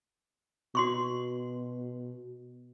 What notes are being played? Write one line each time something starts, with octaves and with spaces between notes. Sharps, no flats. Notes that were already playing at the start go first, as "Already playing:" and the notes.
B2 F#4 C6 C#6